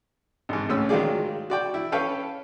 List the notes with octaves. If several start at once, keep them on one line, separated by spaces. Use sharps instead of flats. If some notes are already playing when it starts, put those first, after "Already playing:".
G#1 G#2
C#2 A2 C#4 E6
D#3 F#3 G#3 F4 G#4 D5
F#4 D5 G5
E4
C#4 A4 B4 C#5 F5 G5